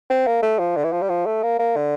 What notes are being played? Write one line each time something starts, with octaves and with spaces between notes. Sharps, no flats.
C4
A#3
A3
F3
D3
E3
F3
G3
F3
A3
A#3
A#3
D3